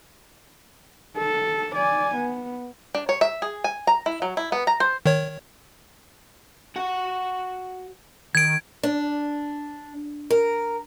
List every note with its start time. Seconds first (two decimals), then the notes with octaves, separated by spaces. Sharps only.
1.18 A4
1.75 D5 G#5
2.15 B3
2.95 D4
3.09 C#5
3.21 E5
3.42 G#4
3.64 G#5
3.87 A#5
4.06 E4
4.22 F#3
4.37 E4
4.52 B3
4.67 A#5
4.80 C5
5.06 D#3 C#5
6.76 F#4 F#5
8.35 D#3 G#6 D7
8.83 D4
10.30 A#4